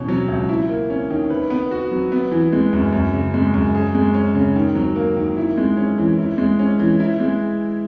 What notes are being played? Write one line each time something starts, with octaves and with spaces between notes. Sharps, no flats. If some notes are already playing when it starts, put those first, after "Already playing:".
Already playing: B2 E3 C#4
F#3
C#2
E4
A#3
C#4
D#3
B4
B3
F#4
F#3
B3
E3
G#3
F#2
F#2
C#3
G#3
F#2
G#4
G#3
C#4
C#3
D#3
F#3
A#3
D#3
E4
G#3
C#4
E3
E4
G#3
C#4
E3
E4
G#3